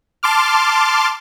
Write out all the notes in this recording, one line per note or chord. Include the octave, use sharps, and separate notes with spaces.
A5 C6 D6 F6